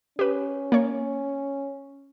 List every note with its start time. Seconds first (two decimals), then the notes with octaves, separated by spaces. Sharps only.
0.19 C#4 G4 B4
0.72 A#3 C#5